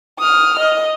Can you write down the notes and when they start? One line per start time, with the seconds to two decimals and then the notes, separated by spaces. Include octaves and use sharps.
0.19 D#6 F6
0.60 D#5